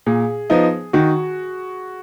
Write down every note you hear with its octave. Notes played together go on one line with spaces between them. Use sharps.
A#2 G#4
F3 B3 D#4
D#3 F#4